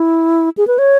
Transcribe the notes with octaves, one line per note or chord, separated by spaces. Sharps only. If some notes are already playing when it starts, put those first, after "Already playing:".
Already playing: E4
G#4
B4
C#5